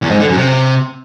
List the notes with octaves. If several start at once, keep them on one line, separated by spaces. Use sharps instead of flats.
E2
G#2
D3
F#2
C3